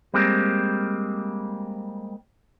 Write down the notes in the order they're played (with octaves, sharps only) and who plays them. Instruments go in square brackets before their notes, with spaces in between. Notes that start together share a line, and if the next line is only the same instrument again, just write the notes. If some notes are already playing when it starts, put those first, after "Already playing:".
[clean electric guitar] G3 G#3 A#3 C4